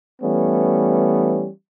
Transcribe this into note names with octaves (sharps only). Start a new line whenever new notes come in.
E3 G3 A3 B3 C#4